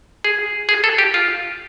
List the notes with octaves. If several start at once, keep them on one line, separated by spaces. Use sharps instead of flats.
G#4
G#4
A4
G4
F4